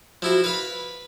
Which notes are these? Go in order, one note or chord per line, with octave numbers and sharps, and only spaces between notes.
F3 E4 F#4
B4 F5 B5